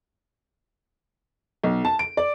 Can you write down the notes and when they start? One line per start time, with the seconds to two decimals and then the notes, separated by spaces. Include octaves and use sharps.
1.64 B1
1.85 A5
1.99 D7
2.17 D5